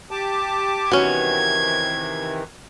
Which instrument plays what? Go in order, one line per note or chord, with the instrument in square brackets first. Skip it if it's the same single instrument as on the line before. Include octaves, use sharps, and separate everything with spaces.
[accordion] G4 A5 D6
[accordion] C3 D#3 E3 [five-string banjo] B3 C#4 [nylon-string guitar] F#4 [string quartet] G#6